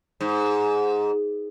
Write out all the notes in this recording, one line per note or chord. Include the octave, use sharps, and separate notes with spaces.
G#2